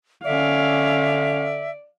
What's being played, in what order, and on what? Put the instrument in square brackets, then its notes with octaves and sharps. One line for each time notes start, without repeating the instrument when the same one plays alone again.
[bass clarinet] D3 [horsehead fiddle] C#4 F5 [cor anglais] D5 [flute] E5